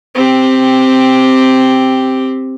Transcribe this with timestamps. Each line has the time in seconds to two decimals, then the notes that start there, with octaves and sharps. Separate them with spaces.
0.15 C4 G4